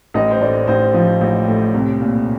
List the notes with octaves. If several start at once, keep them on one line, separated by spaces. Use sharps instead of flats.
A1 D#5
C5
A2 D5
A1 C5
F3
A1
A2
C2
A#2